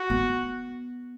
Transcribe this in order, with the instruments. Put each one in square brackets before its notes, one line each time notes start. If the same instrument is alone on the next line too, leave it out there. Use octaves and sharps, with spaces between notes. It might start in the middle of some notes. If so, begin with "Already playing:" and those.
Already playing: [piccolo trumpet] F#4
[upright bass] B3